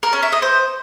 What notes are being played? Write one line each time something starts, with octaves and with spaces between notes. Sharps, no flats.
A#4
C#4
E5
D#5
C5